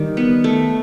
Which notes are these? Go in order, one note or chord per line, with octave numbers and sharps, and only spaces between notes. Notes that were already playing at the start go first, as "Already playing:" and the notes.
Already playing: D#3 G3
B3
A3